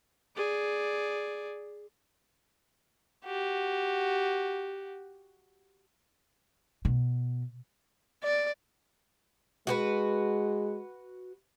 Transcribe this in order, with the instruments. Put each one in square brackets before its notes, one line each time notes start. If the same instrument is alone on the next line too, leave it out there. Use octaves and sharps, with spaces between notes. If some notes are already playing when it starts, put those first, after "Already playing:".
[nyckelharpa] G#4 D5
[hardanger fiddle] F#4 G4
[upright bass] B2
[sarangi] D5
[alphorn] G#3 [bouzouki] F#4 G4 B4